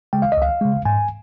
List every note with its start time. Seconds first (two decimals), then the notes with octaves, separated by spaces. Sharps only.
0.13 C#3 G#3 G5
0.22 F5
0.32 D#5
0.37 C#2 F5
0.61 C#3 G#3
0.85 G#2 G#5